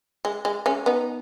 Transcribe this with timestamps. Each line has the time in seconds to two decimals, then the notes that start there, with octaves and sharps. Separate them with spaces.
0.25 G#3
0.45 G#3
0.66 G#3 C#4
0.86 B3 D#4